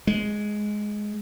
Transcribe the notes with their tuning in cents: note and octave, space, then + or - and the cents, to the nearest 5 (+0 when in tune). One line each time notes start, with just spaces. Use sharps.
G#3 +5